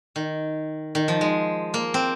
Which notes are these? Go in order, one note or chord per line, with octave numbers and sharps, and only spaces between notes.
D#3
D#3
F3
G#3
A#3
C4